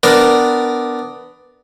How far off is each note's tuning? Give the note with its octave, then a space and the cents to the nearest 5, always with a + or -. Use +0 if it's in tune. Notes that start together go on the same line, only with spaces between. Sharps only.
B3 +10 D4 +0 A#4 +0